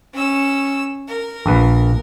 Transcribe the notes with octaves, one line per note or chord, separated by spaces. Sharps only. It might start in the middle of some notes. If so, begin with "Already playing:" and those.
C#4 E6
A#4
A#1 B4